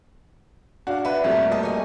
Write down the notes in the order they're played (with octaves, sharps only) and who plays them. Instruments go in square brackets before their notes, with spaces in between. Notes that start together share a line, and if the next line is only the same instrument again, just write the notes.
[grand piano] D4 F5 [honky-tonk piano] F#4
[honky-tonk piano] F#4 B4 [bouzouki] E5
[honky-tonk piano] F2 B2 [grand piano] G3 A3 A#3
[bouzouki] G#3 B4 A5 [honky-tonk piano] D#5
[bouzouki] C#5 G#5